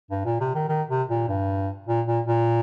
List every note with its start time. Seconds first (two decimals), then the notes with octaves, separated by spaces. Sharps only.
0.11 G2
0.25 A#2
0.40 C3
0.55 D#3
0.69 D#3
0.89 C3
1.09 A#2
1.28 G2
1.87 A#2
2.07 A#2
2.27 A#2